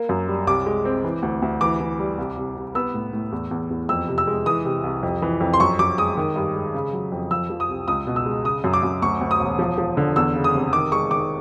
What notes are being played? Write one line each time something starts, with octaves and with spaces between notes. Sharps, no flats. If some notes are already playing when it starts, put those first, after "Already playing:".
Already playing: A#3
F#2
G3
C2 D6
G#3
C4
E3
D2
D2
E3 D6
E3
G3
C2
C2
C2
B3 E6
A2
A2
E2
E2
E2
F2 E6
C3
E6
G#3
E3 D#6
C3
C2
F2
E3
F2
C6
F#2 C#6
F#2 D6
G#3 D#6
D#3
G2
G#3
C#3
F#3
F2
F3 E6
F3
D#6
C2
C#2 D#6
B2
E6
G#3
C#3 D#6
F#2
D6
F#2
D2 C#6
D2
D#6
E1
F3
F3
D3
E2 E6
C#3
D#6
F1
D#3 D6
G#3 C#6
D#3 D6